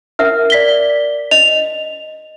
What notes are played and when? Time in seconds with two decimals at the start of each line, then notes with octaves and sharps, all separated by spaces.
0.19 A#4 E5 F#5 F6
0.50 D5 B6 G7
1.31 D#5 F7